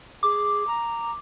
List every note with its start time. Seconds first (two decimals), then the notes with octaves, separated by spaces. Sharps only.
0.23 G#4 D6
0.67 A#5